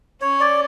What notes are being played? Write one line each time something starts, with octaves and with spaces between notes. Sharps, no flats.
C#4 C#5
D5